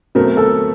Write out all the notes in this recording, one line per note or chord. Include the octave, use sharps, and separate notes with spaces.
B2 F#3 A3 C4 A#4
A4